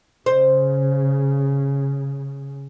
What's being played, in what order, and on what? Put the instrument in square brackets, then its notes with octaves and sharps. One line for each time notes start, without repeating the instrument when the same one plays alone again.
[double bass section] C#3 [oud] C5